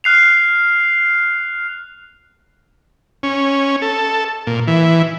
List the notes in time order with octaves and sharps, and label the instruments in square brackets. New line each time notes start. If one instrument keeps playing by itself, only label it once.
[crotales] F6 F#6 C7 F7
[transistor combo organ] C#4
A4
A#2
E3